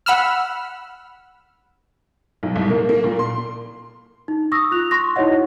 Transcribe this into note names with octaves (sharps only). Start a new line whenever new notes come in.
F#5 B5 E6 F6
B1
C2
A#3
A#3
A#2
C6
D#4
C#6 D#6 E6 A#6
F4 F#6 F7
C6 C#6 A#6
D#4 E4 F#4 C#5 D#5 F#5